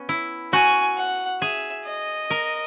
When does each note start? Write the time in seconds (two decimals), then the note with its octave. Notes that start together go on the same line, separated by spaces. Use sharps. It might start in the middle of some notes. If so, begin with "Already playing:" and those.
Already playing: B3 C#4
0.09 E4
0.53 F#4 G#5
0.97 F#5
1.41 G#4 E5
1.85 D#5
2.30 A#4